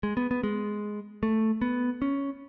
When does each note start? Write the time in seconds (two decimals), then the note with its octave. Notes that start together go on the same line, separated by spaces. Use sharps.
0.03 G#3
0.17 B3
0.31 B3
0.43 G#3
1.23 A3
1.62 B3
2.02 C#4